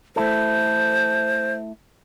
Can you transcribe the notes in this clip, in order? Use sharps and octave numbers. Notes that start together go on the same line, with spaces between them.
A3 E4 A4 C5